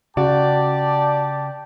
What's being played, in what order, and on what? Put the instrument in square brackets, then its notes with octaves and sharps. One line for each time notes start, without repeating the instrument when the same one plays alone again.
[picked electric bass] C#3 [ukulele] F#4 [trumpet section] G4 A5 [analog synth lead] D5